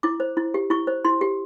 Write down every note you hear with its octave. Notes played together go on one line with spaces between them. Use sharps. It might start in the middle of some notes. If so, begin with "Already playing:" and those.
E4 D6
C5
E4
G4
E4 C#6
C5
E4 C6
G4